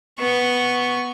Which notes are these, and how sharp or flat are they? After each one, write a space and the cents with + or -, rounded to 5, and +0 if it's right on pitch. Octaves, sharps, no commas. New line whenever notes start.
B3 +0 C#6 +0